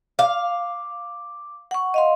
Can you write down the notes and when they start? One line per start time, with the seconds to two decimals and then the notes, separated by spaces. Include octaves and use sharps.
0.19 F5 D6
1.71 F#5 C#6
1.94 D#5 F5 C6